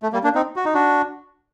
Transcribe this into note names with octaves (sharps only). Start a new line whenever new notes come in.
A3
G3 A#3
A#3 D4
C4 D#4
F#4
D#4
D4 F#4